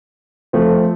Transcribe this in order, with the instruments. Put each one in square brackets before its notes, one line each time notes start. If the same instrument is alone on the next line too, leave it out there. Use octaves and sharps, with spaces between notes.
[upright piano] F3 A3 C4